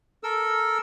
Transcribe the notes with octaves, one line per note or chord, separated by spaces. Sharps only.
A4 A#4 E6